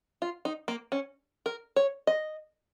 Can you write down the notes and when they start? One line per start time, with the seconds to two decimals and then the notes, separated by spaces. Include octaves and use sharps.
0.22 F4
0.45 D#4
0.68 A#3
0.92 C#4
1.46 A#4
1.76 C#5
2.07 D#5